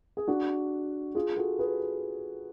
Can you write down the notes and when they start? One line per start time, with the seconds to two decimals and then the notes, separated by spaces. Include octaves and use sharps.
0.17 G#4
0.28 D4 F#4
1.15 F4 G#4
1.37 F#4 A4
1.59 G#4 B4